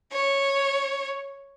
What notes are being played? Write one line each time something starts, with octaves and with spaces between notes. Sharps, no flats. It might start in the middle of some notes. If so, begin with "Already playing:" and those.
C#5